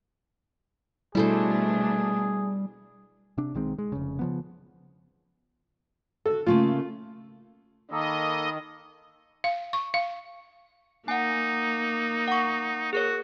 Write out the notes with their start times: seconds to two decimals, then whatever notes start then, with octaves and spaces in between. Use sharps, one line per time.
1.15 B2 G3 A3 D4 E4 G#4 A4 C5
3.38 C3 D4
3.55 B1 D#3 G#3 C4
3.78 G#3
3.92 F1 C#3
4.19 C#3 F3 B3
6.26 F#4 A4
6.46 C#3 A3 A#3 F4
7.92 D#3 A#3 A4 D#5 A#5 B5 D#6
9.44 F5
9.73 C#6
9.94 F5
11.08 A#3 D#4 F#5 G#5
12.28 F#5 C#6
12.93 F#4 G#4 A#4 C#5